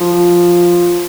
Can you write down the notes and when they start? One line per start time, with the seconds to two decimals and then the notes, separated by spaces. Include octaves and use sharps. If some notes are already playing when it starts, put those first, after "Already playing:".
0.01 F3